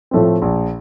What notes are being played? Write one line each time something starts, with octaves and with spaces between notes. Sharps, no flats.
A2 F3 A3 C4
A#1